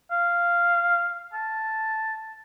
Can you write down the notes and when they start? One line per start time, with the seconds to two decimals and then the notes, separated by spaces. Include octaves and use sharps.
0.11 F5
1.34 A5